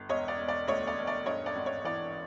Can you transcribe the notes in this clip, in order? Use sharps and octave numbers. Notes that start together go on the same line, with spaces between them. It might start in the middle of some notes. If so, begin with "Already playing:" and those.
Already playing: G1
E1 C#5 D#5
D5
E1
D5
D2 C#5 D#5
D5
E1
D5
G2 C#5 D#5
D5
G#1
C#5
E3 D5